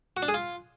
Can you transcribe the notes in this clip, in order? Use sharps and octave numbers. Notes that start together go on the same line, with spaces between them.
F#4
D4
G#4
F4